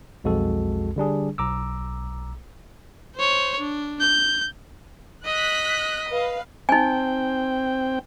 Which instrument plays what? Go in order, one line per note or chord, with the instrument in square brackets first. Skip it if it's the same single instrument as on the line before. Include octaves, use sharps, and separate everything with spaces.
[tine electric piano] B1 F2 G#3 F#4 A4
D3 G3 D4 G#4
B1 A#5 D6 E6
[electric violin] C5 C#5
D4
G6
[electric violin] D#5 [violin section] F#6 B6
[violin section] B4 F5
[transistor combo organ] C4 G5 [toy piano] D#4 G#5